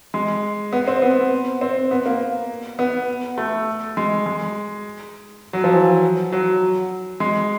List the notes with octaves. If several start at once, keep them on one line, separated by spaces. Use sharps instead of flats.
G#3
B3
C4
B3
C4
B3
A#3
B3
A3
G#3
G#3
F#3
F3
E3
F#3
G#3